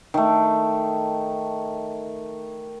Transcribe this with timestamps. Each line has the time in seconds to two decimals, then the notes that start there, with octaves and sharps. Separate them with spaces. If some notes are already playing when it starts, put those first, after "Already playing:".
0.14 D#3 A3